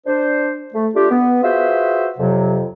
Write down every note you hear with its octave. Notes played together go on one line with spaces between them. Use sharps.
D4 C5
A3
A3 D4 F4 G4
B3
F4 F#4 G#4 B4 C5 E5
F2 C3 F#3